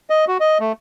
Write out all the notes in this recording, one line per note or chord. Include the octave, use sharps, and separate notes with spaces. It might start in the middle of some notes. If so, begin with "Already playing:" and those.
D#5
F#4
D#5
A3